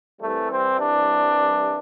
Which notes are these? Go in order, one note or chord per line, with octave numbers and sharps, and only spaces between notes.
C2 C3 E3 G3 A3
C4
D4